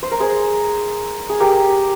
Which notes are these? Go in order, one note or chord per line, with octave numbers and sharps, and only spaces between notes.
C5
A#4
G#4 C5
G#4
G4 A#4